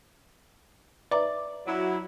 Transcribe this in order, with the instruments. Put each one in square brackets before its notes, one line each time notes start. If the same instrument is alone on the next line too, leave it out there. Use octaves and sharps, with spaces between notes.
[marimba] B4 E5 A#5 [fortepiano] D5
[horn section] F#3 E4